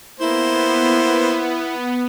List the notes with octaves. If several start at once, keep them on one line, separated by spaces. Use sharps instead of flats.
A#3 B3 E4 C5